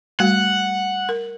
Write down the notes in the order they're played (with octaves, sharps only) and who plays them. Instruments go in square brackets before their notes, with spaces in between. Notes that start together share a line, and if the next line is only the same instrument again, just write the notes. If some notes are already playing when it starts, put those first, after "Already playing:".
[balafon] G3 A3 F#4 [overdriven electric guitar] F#5
[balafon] A#4